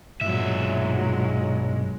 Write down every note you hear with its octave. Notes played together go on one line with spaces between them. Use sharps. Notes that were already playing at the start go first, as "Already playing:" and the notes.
B1 G2 A#2 F#3 G#3 E5